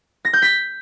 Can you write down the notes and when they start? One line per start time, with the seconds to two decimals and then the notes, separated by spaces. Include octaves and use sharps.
0.25 A#6
0.33 G6
0.42 B6